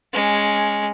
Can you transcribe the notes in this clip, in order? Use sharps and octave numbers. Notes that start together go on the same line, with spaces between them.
G#3 C#4